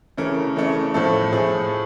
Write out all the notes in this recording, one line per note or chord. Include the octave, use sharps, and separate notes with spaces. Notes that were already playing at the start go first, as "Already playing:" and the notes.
C#3 E3 A3 C#4 A#4
C#3 E3 A3 C#4
A2 F3 A3 A4
A2 F3 A3 G#4